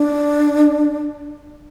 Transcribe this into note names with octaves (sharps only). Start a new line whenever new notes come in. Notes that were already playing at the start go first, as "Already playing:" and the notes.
Already playing: D4